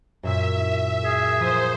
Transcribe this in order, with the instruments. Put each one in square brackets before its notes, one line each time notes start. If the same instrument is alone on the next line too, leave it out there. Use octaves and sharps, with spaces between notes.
[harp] F#2 A#2 E6 [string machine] E5
[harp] E4
[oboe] G#4
[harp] F3 A#3 D#6 [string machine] C5